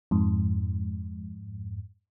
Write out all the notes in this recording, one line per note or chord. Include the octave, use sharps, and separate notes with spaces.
F2 G#2